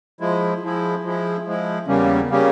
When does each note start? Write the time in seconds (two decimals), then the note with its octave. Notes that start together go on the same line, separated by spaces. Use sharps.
0.20 F3 G#3 E4
0.63 F3 G#3 E4
1.04 F3 G#3 E4
1.46 F3 G#3 E4
1.87 E2 C#3 G3 A#3 C#4
2.30 C#3 G3 A#3 C#4